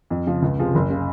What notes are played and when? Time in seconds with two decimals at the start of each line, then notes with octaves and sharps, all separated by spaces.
0.10 F2
0.26 C#3 F3
0.42 C#2
0.58 C3 F3 G#3
0.75 F#1
0.90 C#3